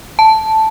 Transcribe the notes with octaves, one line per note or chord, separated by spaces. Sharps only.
A5